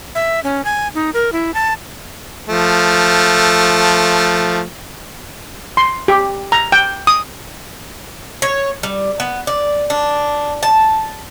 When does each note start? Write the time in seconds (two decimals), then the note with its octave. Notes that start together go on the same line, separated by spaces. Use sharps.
0.15 E5
0.44 C#4
0.65 G#5
0.95 D#4
1.14 A#4
1.33 E4
1.54 A5
2.49 F3 A3
5.77 C6
6.08 G4
6.52 A#5
6.72 G5
7.07 D#6
8.42 C#5
8.83 G3
9.20 B3
9.47 D5
9.90 D4
10.63 A5